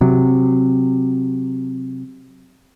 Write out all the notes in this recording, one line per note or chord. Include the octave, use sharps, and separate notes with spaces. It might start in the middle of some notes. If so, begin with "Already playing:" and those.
C3 F#3